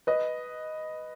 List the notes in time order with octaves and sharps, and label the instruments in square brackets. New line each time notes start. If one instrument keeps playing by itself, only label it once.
[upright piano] B4 D#5